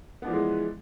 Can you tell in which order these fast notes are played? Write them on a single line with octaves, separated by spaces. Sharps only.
B3 D4 F3 E3 G#3